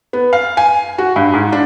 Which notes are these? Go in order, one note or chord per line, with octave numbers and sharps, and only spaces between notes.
B3
F5
G#5
F#4
G2
G#2
D4